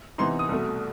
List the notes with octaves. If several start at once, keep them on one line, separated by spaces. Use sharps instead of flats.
C3 E3 B3 D#4 C6
D#6
C2 B2 A3